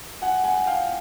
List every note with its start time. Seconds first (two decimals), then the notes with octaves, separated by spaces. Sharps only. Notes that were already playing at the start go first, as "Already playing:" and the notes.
0.22 F#5 G#5
0.44 F#5 G#5
0.67 F5 G5